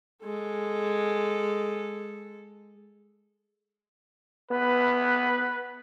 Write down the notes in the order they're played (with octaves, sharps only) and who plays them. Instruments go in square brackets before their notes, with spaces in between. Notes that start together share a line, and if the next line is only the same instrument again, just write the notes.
[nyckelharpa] G#3 A4
[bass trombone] B3 [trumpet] B4